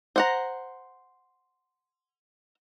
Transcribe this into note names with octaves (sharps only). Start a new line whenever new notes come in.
C5 F#5 A#5